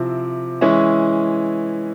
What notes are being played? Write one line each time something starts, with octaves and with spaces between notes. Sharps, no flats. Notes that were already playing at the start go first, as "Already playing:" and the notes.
Already playing: C3 F3 C4 E4
E3 G#3 C#4 E4